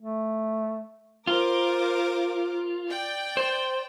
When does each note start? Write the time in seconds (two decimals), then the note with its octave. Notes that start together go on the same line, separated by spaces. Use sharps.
0.01 A3
1.27 F4 A#4 C5 D6
2.88 D5 G5
3.37 C5